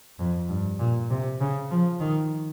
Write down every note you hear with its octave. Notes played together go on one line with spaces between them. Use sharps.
F2
G2
A#2
C3
C#3
F3
D#3